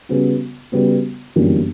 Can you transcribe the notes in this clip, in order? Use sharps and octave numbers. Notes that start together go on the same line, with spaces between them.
C#3 G3 B3 F#4
C#3 G3 B3 F#4
G1 F#2 E3 G3 A#3